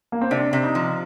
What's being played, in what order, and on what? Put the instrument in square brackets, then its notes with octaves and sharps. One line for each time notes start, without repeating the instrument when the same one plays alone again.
[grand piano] A#3
C4
[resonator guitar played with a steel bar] C3 [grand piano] D4
[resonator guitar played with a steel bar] C3
[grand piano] D#4
[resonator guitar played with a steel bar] F3